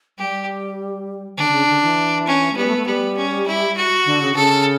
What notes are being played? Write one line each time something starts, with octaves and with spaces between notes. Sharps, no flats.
G3 G4
D3 D4
D3
C#3
D3
E3
C#4
A3
G3 B3
A3
A3
G3 B3
C#4
E4
F#4
D3
C#3
C#3 A4